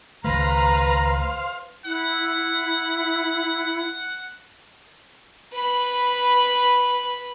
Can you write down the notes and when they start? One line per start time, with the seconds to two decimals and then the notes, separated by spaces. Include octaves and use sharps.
0.24 C#2 D#3 A3 B4 C5 F5 A#5
1.86 E4 F#5
5.53 B4 B5